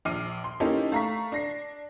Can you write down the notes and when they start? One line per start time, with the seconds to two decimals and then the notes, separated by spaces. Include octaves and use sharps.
0.05 A#1 D6 F6 C7 D#7
0.44 C6
0.60 A#3 C#4 D#4 E4 G4 A4
0.92 A3 F5 A#5 C#6 B6
1.32 D4 A#6 C7